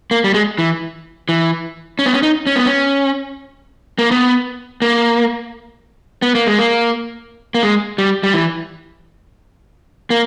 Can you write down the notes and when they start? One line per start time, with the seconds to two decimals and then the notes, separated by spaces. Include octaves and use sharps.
0.11 A#3
0.24 G3
0.34 G#3
0.59 E3
1.29 E3
1.99 C#4
2.06 B3
2.13 C#4
2.23 D#4
2.47 C#4
2.56 B3
2.66 C#4
3.99 A#3
4.11 B3
4.82 A#3
6.22 B3
6.35 A#3
6.47 G#3
6.59 A#3
7.55 A#3
7.63 G#3
7.98 G3
8.23 G3
8.34 E3
10.10 A#3